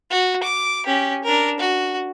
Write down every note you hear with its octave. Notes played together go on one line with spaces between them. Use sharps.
F#4
D6
C#4 G4
D4 A#4
F#4